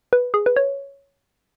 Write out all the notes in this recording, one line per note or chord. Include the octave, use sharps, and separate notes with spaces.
B4
G#4
B4
C#5